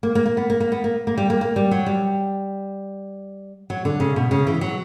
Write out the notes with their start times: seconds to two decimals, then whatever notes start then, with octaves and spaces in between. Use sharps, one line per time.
0.03 A#3
0.15 A#3
0.26 A#3
0.37 B3
0.50 A#3
0.60 A#3
0.72 B3
0.84 A#3
1.07 A#3
1.18 G3
1.30 A#3
1.41 A#3
1.56 G3
1.71 F#3
1.86 G3
3.70 F#3
3.85 D3
4.00 C#3
4.16 B2
4.31 C#3
4.47 E3
4.61 F#3